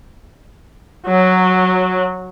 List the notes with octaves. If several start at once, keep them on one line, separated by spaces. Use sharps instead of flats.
F#3